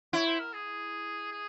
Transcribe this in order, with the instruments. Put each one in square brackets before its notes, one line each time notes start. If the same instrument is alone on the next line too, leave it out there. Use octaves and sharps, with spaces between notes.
[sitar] E4 [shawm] C#5
[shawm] C5
A#4
G#4
G#4